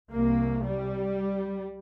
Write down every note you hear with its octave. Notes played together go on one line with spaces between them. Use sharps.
C2 C3 A#3
G3